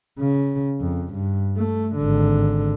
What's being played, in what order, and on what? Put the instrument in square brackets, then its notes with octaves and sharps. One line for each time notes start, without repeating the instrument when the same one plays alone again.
[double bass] C#3
F2
G2
A3
G#1 D3